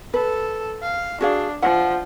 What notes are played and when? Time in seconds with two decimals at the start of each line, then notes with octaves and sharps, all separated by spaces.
0.14 A4 B4
0.82 F5
1.21 D4 F#4 G#4 F5
1.62 F3 F#5